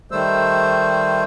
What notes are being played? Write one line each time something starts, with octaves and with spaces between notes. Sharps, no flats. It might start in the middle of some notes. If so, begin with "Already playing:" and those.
D#3 G3 A3 C5 E6